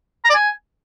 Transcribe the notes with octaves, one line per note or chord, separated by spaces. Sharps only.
A#5
D5
G#5